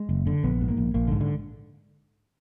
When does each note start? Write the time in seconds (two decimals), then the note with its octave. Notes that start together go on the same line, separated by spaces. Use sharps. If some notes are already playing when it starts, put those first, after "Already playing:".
Already playing: G#3
0.09 F#1
0.27 D3
0.43 A#1 B3
0.61 G#2
0.69 A#3
0.77 A#1
0.94 A#1 A#3
1.08 G#2 D3
1.21 D3